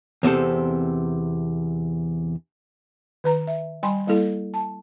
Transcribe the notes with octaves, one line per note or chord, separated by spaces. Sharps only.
E2 C3 C4 A4
D#3 B4 A#5
E5
G3 G5 G#5 B5 C6
G3 A#3 E4 A4
A5